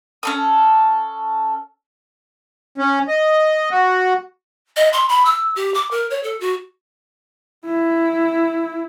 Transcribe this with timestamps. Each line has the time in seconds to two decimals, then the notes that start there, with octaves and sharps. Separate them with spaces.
0.23 C#4 A4 D#6
2.78 C#4
3.08 D#5
3.71 F#4
4.76 D#5
4.93 C6
5.09 B5
5.25 E6
5.56 G4
5.74 D6
5.91 A#4
6.11 C#5
6.23 A4
6.40 F#4
7.65 E4